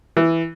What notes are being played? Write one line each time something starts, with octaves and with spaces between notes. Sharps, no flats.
E3